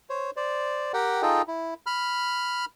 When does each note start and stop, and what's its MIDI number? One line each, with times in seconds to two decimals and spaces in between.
0.10 0.31 72
0.10 0.31 73
0.37 0.92 72
0.37 0.92 74
0.94 1.22 67
0.94 1.22 70
0.94 1.22 78
0.94 1.22 79
1.22 1.42 63
1.22 1.42 65
1.22 1.42 68
1.22 1.42 69
1.22 1.42 75
1.22 1.42 79
1.47 1.74 64
1.86 2.65 83
1.86 2.65 89